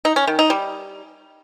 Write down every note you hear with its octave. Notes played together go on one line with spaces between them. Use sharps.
D#4
C#4
D#3
D#4
G3